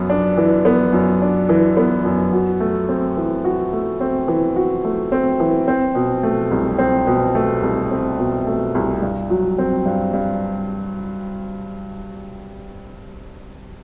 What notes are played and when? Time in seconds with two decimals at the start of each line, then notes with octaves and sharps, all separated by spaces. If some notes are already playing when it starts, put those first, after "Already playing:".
Already playing: F#2 B3
0.10 D4
0.38 E3
0.65 B3
0.93 F#2
1.22 D4
1.49 E3
1.77 B3
2.05 F#2
2.33 F#4
2.60 A3
2.89 C4
3.17 E3
3.45 F#4
3.73 A3
4.01 C4
4.28 E3
4.56 F#4
4.84 A3
5.12 C4
5.40 E3
5.68 C4
5.95 B2
6.23 A3
6.51 C2
6.79 C4
7.07 B2
7.35 A3
7.62 C2
7.91 C4
8.19 B2
8.47 A3
8.75 C2
9.02 G2
9.30 F#3
9.58 C4
9.86 G2
10.13 G2